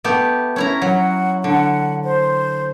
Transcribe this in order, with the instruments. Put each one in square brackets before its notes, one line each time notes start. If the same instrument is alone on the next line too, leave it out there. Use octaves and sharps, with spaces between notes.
[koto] A3 B3 G4
C#4 E4 A#5
[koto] F#3 [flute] F#5
[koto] D3 [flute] F#5
[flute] C5